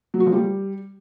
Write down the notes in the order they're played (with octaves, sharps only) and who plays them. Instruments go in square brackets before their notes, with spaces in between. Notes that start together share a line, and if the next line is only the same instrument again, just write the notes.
[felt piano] F#3
F#4
F3
G3